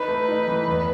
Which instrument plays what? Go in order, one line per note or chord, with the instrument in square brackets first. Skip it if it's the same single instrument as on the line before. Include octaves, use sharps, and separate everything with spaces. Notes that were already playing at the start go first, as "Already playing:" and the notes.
Already playing: [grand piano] D#4 [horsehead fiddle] B4
[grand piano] A3
D#4
E3
E2